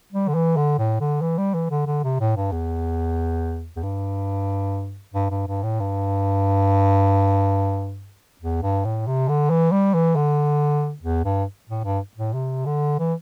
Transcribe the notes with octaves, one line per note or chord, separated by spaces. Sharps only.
G3
D3
E3
D3
A2
D3
E3
G3
E3
D3
D3
C3
A2
G2
E2
E2
G2
G2
G2
G2
A2
G2
E2
G2
A2
C3
D3
E3
G3
E3
D3
E2
G2
A2
G2
A2
C3
D3
E3